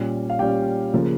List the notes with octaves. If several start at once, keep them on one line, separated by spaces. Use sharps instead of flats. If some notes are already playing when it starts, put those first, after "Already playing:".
Already playing: A#2 G3 C#4
F5
A#2 G3 C#4 G4 G5
C#3 F3 A#3